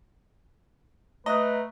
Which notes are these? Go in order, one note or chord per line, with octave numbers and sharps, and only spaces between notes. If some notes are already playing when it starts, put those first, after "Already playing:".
A3 B4 D#5 A#5 F#6